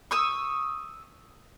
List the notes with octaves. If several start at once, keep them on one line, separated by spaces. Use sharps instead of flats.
C#6 D#6 E6